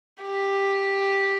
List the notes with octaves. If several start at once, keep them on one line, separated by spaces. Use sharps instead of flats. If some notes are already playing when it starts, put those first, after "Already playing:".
G4